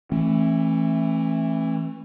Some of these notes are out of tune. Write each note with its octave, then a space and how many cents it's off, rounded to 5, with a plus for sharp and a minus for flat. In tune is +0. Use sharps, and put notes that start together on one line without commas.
E3 +5 A3 +0 C#4 -45